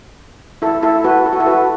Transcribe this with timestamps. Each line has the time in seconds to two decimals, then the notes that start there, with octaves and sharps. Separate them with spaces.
0.62 E4 A4
0.83 E4 A4
1.04 F#4 B4
1.26 A4
1.33 F#4
1.40 E4 A4
1.47 F#4 B4